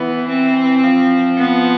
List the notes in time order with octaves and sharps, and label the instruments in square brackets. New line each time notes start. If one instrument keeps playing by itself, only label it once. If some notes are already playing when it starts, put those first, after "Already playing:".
Already playing: [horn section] E3 [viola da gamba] B3
[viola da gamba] C4
[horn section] F3
[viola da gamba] B3